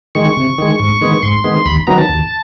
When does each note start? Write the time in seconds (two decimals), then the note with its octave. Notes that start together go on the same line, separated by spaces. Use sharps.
0.15 D#3 G#3 C#6
0.37 C3
0.58 D#3 G#3
0.80 G#2
1.01 D#3 G#3 B3
1.23 G#2 C6
1.44 D#3 G#3 B3
1.66 D#2 B5
1.87 D#3 F#3 B3 A#5
1.98 A5
2.09 D#2